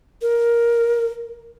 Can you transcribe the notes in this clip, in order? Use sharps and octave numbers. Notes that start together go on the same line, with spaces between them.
A#4